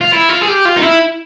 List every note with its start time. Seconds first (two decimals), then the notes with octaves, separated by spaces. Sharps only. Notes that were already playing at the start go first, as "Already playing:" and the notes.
0.01 F4
0.13 E4
0.29 F4
0.41 G#4
0.48 G4
0.65 F4
0.77 D#4
0.82 E4